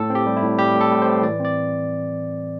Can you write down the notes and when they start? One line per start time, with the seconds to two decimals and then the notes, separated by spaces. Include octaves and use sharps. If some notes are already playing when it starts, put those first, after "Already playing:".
Already playing: A2 A4
0.10 C4
0.15 G4
0.26 G3
0.37 E4
0.43 A2
0.58 G3 G4
0.75 A2
0.81 A4
0.91 A2
1.02 A2 C5
1.23 E3 D5
1.40 C4 D5